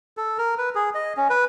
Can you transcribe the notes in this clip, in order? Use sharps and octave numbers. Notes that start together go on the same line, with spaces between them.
A4
A#4
B4
G#4
D#5
C#4
B4